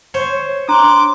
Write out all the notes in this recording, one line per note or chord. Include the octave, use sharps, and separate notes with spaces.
C5 C#5
D4 A#5 C6 D6 F#6